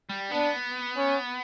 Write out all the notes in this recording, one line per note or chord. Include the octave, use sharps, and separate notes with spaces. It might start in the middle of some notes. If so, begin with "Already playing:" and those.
G3
B3 D4
C#4